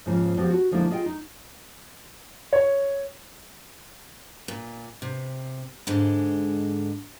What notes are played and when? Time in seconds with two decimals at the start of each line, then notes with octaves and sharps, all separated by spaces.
0.06 G#2 C#3 F3 A#3
0.37 F3 B3 C4 F#4 G4
0.50 F#4
0.71 D3 F3 G#3 A#3 D#4 E4
0.90 F4 G#4 D#5 F5 G5
1.06 D#4
2.53 C#5
4.48 A#2
5.02 C3
5.87 G#2 D3 G#3